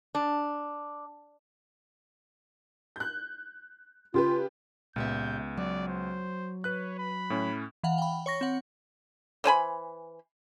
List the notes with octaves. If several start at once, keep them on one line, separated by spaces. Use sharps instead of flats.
D4
F#6 G6
C#3 F4 G4 B4
C#2 A#2 B3 G4 E5 G6
F#3 D5
C5
B4 C#5 F#6
B5
A2 C#4
E3 F5 F#5
G5 B5
C#5 C#6 A#6
C4 F#5
E3 C5 G#5 B5